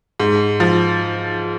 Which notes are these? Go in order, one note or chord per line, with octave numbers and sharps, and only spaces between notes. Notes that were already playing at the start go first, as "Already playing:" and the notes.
G#2
F3